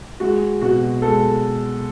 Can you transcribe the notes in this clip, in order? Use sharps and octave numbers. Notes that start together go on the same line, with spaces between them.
G#3 F#4
B2 F#4
G#3 A4